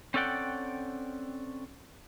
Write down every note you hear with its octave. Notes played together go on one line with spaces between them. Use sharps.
C4 C#4 A4 D5 F#5 G5